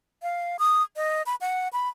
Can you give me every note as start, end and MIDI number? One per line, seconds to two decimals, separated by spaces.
0.23 0.57 77
0.59 0.83 87
0.96 1.22 75
1.26 1.35 83
1.41 1.68 78
1.73 1.89 83